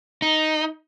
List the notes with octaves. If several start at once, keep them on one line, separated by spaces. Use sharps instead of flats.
D#4